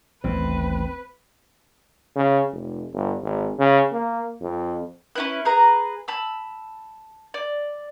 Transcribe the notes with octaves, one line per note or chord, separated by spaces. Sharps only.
A1 D#2 C4 B4
C#3
F1
G1
G#1
C#3
A#3
F2
C#4 E4 B4
G#4 B4 A#5
A5 B5 E6
D5